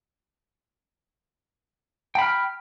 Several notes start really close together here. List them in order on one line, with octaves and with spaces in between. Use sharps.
G5 B5 F6